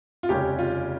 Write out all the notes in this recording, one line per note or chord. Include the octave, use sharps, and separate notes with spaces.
F4
F1 D#2 C#3 G#3 C#4 G4
F4